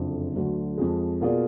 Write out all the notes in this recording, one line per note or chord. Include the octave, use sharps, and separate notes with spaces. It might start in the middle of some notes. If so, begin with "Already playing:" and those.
Already playing: F#1 F2 D3
D2 D3 F#3
F2 F3 G#3
B2 A#3 F4 G#4 D5